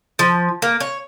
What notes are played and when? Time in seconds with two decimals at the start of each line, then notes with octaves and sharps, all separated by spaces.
0.19 F3
0.62 A#3
0.80 C#5